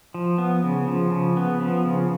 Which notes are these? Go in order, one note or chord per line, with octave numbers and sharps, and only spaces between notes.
F3
B3
C#3
F3
C#3
B3
F3
C#3